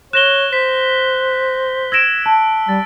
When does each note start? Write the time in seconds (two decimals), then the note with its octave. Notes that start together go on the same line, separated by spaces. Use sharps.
0.13 C#5 F#6 A#6 E7 G7
0.53 C5 B6
1.92 E6 G#6 A#6 D7 E7
2.26 A5
2.69 G3 A6